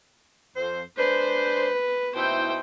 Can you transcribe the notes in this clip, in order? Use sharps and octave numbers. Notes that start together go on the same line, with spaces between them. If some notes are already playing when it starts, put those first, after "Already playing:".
F2 C5
G#3 D4 B4 C5
B2 D#4 E4 C5 G5